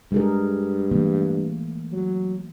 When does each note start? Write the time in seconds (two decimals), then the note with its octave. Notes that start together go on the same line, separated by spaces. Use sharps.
0.12 G2 G#3 G#4 A#4
0.91 E3 A3 A#3
1.92 F#3